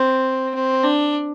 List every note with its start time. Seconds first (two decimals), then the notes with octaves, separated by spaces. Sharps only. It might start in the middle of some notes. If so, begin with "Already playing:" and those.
Already playing: C4
0.55 C4
0.84 D4